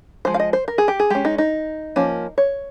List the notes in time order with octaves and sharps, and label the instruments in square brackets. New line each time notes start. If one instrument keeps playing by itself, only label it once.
[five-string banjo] F3 G#3 C5
F5
D#5
C5
A#4
G#4
G4
G#4
G#3 C#4 G4
D#4
D#4
F3 A#3 C#4
C#5